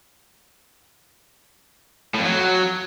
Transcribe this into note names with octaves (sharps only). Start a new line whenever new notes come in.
A2
F2
F#3